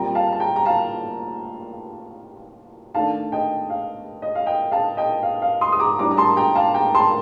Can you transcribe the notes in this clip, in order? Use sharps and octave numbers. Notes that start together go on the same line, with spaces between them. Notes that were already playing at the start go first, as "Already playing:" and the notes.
Already playing: A#2 G3 C4 G5 A#5
F5 A5
A5
G5 A#5
A#5
F5 A5
D#3 A3 D4 F5 A5
D#5 G5
F5
D#5
F5
D#5 G5
F5 A5
D#5 G5
F5
F5
C6 D#6
D#6
A#5 D6
A2 G3 D4 A#5 D6
A#5
A5 C6
G5 A#5
F5 A5
G5 A#5
A5 C6